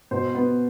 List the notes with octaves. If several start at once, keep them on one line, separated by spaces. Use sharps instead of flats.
B2 C5
B3